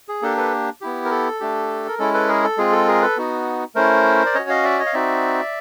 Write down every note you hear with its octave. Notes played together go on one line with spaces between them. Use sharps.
G#4
A#3 D4 G4 A4
A4 B4
B3 E4 G4
A#4
A4
A3 D4 G4
A#4
G#3 C#4 E4 A4
A4 B4
G#4 A#4
A4
G#3 C4 F4 G#4
A4
G#4 A#4
A4 B4
B3 D#4 F#4
A3 C#4 E4 A#4 C5
D5
C#4 F#4 C#5 D#5
D#5 F5
D5 E5
C#5 D#5
F5
C4 D#4 F#4 D5 E5